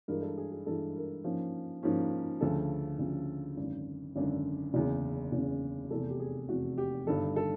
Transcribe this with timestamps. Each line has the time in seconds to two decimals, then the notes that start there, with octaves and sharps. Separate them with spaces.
0.08 G2 E3 G#3 A#4
0.22 A4
0.38 G#4
0.52 G#4
0.66 G2 E3 G#3 A4
0.96 A#4
1.24 G#2 F3 A#3 C#4
1.83 G#2 F3 A#3 C#4
2.41 D2 C#3 F3 A4
2.99 D2 C#3 F3
3.57 G#1 F#2 D3
4.16 G#1 F#2 D3
4.74 F#1 E2 C#3
5.32 F#1 E2 C#3
5.90 F1 E2 C3 A4
6.10 G4
6.19 G#4
6.49 F1 E2 C3 F#4
6.78 G4
7.06 G1 G2 D#3 A4
7.36 A4